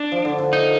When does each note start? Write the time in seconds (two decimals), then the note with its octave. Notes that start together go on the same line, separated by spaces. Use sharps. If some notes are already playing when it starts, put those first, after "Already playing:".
Already playing: D4
0.12 F3
0.25 D3
0.38 D3
0.53 D#4